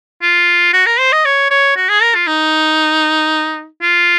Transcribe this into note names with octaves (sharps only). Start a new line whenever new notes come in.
F4
F#4
A#4
C5
D#5
C#5
C#5
F#4
G#4
A#4
F4
D#4
F4